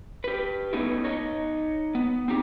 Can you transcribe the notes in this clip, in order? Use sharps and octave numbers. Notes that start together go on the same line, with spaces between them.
G4 B4
A3 B3 C#4 D#4 E4
D#4 C#5 D#5
B3
C4 D#4 G4